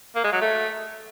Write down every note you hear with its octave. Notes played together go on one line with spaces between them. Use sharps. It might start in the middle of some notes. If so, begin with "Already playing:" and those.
A#3
G#3
F#3
A3